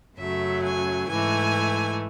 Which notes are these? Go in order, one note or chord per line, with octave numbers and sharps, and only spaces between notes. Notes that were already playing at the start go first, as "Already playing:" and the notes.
F#2 C#3 F#3 A3 E5
G#5
G#2 E3 A3 G#5